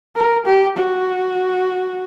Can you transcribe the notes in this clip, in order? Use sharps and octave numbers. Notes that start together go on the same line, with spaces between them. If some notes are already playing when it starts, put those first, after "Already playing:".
A#4
G4
F#4